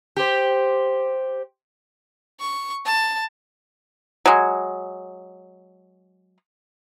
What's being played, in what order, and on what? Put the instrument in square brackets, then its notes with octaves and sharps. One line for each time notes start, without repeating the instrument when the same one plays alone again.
[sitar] G4 C5
[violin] C#6
A5
[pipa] F#3 G#3